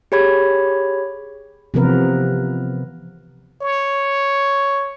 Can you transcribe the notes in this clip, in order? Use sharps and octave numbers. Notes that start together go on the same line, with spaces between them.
G4 G#4 C#5 B5 G#6
C3 E3 F3 B3 A#4 B4
C#5